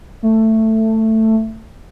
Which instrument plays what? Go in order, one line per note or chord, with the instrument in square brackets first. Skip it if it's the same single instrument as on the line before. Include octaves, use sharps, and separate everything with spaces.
[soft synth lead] A3